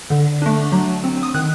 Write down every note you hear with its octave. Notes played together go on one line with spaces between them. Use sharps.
D3
A3 D4
F#3
C4
D#6
D#3 F#6